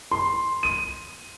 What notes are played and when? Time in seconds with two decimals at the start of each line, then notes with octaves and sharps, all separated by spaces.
0.11 C6
0.63 D#7